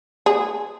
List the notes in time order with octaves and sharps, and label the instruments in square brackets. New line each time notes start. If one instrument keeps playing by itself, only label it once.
[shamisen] G#4